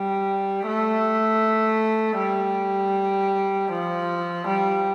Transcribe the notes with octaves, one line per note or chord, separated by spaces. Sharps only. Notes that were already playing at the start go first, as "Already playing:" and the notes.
Already playing: G3
A3
G3
F3
G3